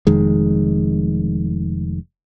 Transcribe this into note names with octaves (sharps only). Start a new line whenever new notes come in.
F1 F2 D#3 G#3